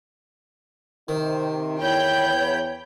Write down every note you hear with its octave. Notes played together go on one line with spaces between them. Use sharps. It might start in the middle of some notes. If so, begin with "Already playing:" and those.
C3 D#3 D#4 C5
E2 C#5 G5 B5 G6